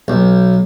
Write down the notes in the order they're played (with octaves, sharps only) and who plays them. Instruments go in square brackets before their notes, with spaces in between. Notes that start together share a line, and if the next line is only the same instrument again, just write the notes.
[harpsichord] B1